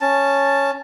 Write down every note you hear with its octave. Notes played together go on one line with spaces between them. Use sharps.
C#4 A5